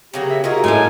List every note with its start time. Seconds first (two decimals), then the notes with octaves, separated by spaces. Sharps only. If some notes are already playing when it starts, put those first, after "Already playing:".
0.14 C#3 F#3 A#3 G4
0.30 E5
0.44 A#3 D#4 F4 F#4 G#4
0.64 A2 C#4 F4 A4 G#5